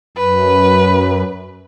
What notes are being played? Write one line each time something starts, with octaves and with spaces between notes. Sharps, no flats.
F#2 B4